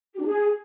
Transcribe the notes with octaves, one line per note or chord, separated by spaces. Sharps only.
G4
D4
G#4